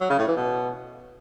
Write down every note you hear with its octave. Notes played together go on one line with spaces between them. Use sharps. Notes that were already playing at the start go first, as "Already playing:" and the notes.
F#3
C#3
A2
E3
B2